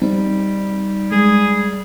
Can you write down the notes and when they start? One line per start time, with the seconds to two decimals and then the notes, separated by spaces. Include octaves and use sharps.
0.02 G3 C4 D#4
1.12 G#3 G#4